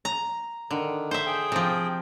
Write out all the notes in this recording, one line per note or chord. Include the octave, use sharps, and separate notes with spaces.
A#5
D3 D#3
C5 E5
G#4 G5
C3 F3